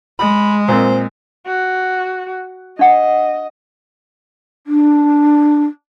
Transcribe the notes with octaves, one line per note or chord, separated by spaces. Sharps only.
G#3 B5
A#2 C4 C5
F#4
D4 D#5 F#5
D4